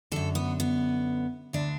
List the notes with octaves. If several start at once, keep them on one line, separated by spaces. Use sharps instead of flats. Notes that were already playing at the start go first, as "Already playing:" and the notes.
F#2 D3 A4
B3
B3
D2 D3 D4